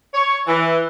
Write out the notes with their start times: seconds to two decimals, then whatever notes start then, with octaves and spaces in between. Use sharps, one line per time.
0.14 C#5
0.47 E3